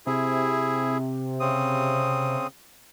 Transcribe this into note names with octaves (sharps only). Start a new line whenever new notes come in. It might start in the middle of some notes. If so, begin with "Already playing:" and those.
C3 E4 G#4
C#3 C4 D#6